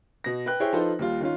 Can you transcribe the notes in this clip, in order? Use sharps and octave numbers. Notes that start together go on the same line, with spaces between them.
B2 A#6
B4 G5 F#6
E4 G#4 C5 C#5 E5 G5
F3 D#4 F4 A4 B4 C5
D#2 G3 F4
D#3 C#4 F4